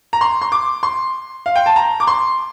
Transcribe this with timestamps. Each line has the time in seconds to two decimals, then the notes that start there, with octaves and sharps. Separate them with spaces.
0.13 A#5
0.21 C6
0.42 C6
0.52 D6
0.83 C6
1.46 F5
1.56 G5
1.66 A5
1.76 A#5
2.00 D6
2.07 C6